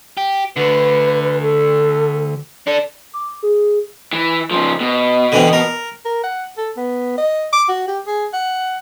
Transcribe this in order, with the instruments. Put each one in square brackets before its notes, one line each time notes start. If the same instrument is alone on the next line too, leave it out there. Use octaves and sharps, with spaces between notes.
[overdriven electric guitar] G4
[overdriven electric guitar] D2 D3 [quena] B4
[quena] A4
[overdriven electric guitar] D4 A4 [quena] D5
[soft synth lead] D6
G#4
[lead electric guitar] E3
C#3 F3
B2
[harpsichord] D3 E3 C4
A#4
[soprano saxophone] A#4
F#5
A4
B3
D#5
D6
F#4
G4
G#4
F#5